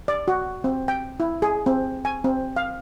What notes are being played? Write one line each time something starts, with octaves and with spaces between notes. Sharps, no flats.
D5
F#4
C4
G5
E4
G#4
C4
G#5
C4
F5